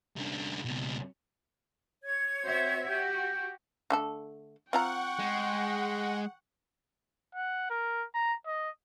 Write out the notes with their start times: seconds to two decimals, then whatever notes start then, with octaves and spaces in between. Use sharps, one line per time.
0.16 C2 D3
0.65 C#2 B2
2.04 C#5 G#6
2.44 C4 F#4 C5 E5
2.90 F#4 G4 G5
3.90 D3 A3 A4
4.73 C4 F4 F#5 G5 A#5 C#6
5.19 G#3
7.35 F#5
7.70 A#4
8.14 A#5
8.46 D#5